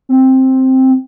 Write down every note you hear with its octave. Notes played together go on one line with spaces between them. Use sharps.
C4